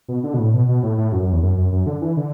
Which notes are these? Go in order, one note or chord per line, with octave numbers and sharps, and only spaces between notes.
B2
D3
B2
A2
B2
B2
A2
A2
F#2
F#2
E2
F#2
F#2
F#2
D3
E3
D3